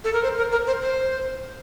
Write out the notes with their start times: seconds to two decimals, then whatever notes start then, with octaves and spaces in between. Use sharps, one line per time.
0.04 A4
0.13 A#4
0.23 C5
0.37 A#4
0.52 A#4
0.67 C5
0.82 C5